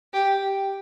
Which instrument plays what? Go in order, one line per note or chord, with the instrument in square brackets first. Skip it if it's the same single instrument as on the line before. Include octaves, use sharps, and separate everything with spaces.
[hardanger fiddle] G4